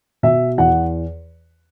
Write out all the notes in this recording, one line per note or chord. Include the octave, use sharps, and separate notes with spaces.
B2 E5
E2 F#5